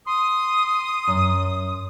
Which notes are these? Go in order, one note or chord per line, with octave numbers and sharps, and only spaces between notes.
C6 D#6
F#2